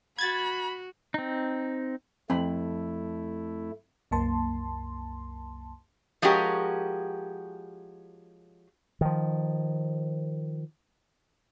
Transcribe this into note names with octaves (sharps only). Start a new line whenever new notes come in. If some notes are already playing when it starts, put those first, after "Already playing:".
F#4 B5 G#6 A6
C4 D#4
F2 A3 C4 E4 B5
C2 F#2 A#3 A5 C6
F3 G#3 C#4 F#4 G4 A#4
D#3 F3